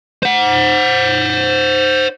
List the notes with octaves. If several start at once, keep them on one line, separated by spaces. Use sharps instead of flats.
C5 F#5